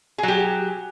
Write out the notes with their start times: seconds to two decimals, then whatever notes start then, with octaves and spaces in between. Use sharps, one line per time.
0.18 G#4
0.23 F#3
0.28 G4